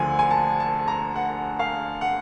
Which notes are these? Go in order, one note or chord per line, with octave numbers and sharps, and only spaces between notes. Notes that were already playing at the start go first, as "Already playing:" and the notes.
Already playing: D2 D3 F3 G#5
G#5
A5
A5
A#5
F#5
F5
F#5